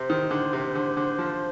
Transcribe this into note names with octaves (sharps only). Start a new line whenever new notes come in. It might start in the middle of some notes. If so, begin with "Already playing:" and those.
Already playing: C3 C5
D#3
D3
C3
D3
D3
F3